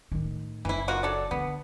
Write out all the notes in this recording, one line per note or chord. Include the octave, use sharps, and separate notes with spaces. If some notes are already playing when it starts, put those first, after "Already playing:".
A2 D#3
F#1 E3 E4
A#3 F4 F#4
F#3 A4 D5
D3 B3